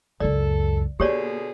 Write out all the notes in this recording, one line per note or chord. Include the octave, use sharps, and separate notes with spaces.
C#2 F#2 A4 D5
B2 D3 A#3 G4 G#4 C#5 D5